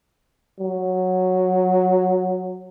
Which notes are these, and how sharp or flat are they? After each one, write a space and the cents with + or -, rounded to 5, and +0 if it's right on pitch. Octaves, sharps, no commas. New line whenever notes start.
F#3 -5